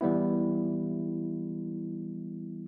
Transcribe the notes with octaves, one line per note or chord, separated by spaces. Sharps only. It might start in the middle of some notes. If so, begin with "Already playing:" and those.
E3 G3 B3 E4